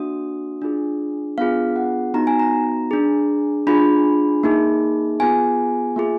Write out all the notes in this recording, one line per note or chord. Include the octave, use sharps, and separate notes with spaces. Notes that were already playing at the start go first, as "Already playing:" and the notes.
Already playing: A#3 D4 F#4 D#6
D4 F4 G#4
B3 D4 F4 G#4 F5
F#5
B3 D#4 F#4 A#5
G#5
A#5
D4 G#4
D4 F4 G#4 B5
A#3 D#4 G#4
B3 F4 G#4 G#5
A#3 F4 G#4